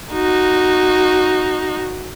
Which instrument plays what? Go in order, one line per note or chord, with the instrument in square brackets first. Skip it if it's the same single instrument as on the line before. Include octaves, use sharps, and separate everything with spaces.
[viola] D#4 F#4